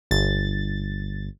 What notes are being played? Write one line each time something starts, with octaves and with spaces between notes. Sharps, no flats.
G1 A6